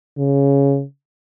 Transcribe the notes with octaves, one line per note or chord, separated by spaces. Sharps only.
C#3